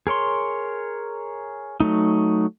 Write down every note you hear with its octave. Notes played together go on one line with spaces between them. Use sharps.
G#4 A#4 C#5 C6
F#3 A3 D#4